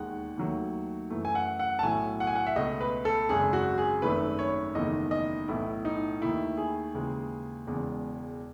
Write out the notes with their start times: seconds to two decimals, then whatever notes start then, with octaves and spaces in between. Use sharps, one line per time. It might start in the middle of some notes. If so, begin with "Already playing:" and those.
Already playing: E1 D#2 D#3 G#3 F#5
0.37 D#2 D#3 F#3 A3
1.10 F#2 E3 A3
1.25 G#5
1.35 F#5
1.59 F#5
1.79 A5
1.83 B1 A2 F#3 A3 G#5
2.20 F#5
2.27 G#5
2.35 F#5
2.46 E5
2.56 C#2 B2 A3 D#5
2.81 B4
3.05 A4
3.29 G#1 F#2 C#3 G#3 G#4
3.53 F#4
3.78 G#4
4.02 G#1 F#2 D#3 A3 B4
4.39 C#5
4.75 F#1 E2 D#3 A3 D#5
5.11 D#5
5.48 B1 A2 E3 A3 E4
5.85 D#4
6.21 D#2 D#3 A3 E4
6.57 G#4
6.94 D#2 C#3 E3 G#3
7.67 E1 E2 C#3 G#3